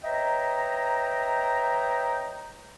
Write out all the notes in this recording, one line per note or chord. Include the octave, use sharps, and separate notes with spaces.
B4 C#5 D#5 E5 G5 A#5